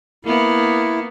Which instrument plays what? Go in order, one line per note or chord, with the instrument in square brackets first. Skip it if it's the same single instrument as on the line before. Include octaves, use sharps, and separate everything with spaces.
[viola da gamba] A#3 B3 [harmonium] E4